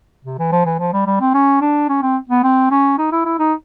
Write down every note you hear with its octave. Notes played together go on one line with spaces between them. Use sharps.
C3
E3
F3
E3
F3
G3
G3
C4
C#4
D4
C#4
C4
B3
C4
C#4
D#4
E4
E4
D#4